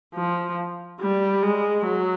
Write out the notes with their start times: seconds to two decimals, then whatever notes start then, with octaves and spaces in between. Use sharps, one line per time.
0.14 F3
1.00 G3
1.43 G#3
1.86 F#3